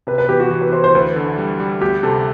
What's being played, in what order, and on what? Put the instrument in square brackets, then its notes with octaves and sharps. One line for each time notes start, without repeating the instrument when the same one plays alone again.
[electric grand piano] C3 [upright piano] B4
[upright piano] B4
[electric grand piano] E3 [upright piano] G4
[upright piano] F#4
[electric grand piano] E3 [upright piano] G4
[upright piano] B4
[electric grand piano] E3 [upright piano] C5
[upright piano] C5
[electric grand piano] D2 [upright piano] B4
[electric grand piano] D3
G3
G3
[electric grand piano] D2 [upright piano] G4
[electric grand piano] C3 [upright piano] A4